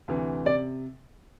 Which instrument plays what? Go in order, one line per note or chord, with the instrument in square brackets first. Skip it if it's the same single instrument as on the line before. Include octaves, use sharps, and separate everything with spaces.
[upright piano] D2 C3 E3
[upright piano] C3 [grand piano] D5